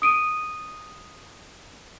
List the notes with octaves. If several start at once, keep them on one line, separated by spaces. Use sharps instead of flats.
D#6 D7 D#7